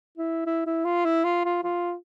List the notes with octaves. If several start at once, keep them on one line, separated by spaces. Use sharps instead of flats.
E4
E4
E4
F4
E4
F4
F4
F4